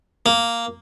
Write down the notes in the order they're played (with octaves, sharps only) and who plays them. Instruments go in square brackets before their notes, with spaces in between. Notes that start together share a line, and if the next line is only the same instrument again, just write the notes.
[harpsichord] A#3